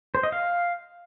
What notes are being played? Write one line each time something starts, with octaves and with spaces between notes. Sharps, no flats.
C5
D#5
F5